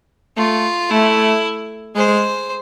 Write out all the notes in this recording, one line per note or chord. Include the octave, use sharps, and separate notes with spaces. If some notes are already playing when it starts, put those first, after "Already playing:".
A3 F4
A3 E4
G#3 C5